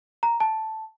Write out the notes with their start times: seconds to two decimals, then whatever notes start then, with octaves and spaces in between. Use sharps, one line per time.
0.23 A#5
0.40 A5